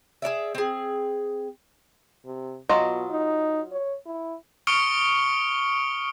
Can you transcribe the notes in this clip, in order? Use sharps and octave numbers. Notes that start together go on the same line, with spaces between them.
G#4 A#4 D5 E5
C4 G#4
C3
B2 F#3 F4 D#5
D#4
C#5
E4
C#6 D#6 F6 C#7 D7 G7